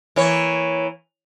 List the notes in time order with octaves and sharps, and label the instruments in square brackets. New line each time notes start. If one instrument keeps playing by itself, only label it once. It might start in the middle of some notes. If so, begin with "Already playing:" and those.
[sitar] E3 A#3 C#5